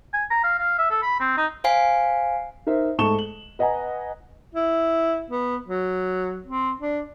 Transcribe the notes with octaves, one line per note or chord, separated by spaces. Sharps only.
G#5
A#5
F5
F5
E5
A4
B5
C4
D#4
C5 F5 G#5 C7
D#4 A#4 C5 E5
G#2 A3 A5 C#6 E7 G7
F#7
B4 D#5 F#5 G#5 A#5
E4
B3
F#3
C4
D4